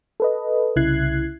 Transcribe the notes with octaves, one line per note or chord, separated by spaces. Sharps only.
A4 B4 D#5
C2 C#3 E4 F#6 G#6 C7